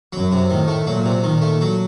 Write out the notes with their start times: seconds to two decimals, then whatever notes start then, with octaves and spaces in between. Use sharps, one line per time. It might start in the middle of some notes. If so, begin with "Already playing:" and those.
0.13 F#2 F#3
0.32 C3
0.50 A2 D#3
0.68 A3
0.87 A#2 F#3
1.05 C3
1.23 A#2 D#3
1.41 A3
1.61 F#3